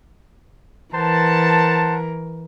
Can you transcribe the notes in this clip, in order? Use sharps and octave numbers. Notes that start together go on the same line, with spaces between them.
E3 A#4 C5 F#5 A5